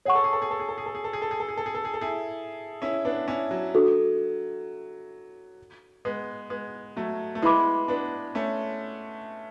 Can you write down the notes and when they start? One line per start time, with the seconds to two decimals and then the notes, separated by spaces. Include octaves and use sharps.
0.05 G#4 C#5 F#5 C#6
0.15 A4
0.24 G#4
0.33 A4
0.42 G#4
0.51 A4
0.60 G#4
0.69 A4
0.78 G#4
0.86 A4
0.95 G#4
1.04 A4
1.13 G#4
1.22 A4
1.31 G#4
1.40 A4
1.48 G#4
1.57 A4
1.66 G#4
1.75 A4
1.85 G#4
1.94 A4
2.01 E4 G#4
2.82 C#4 E4
3.05 B3 D4
3.28 C#4 E4
3.51 F#3
3.75 D4 F#4 A4
6.05 G#3 B3
6.50 G#3 B3
6.96 F#3 A3
7.35 A3
7.42 G#3 B3 E4 B4 E5 B5 D6
7.88 B3 D4
8.35 A3 C#4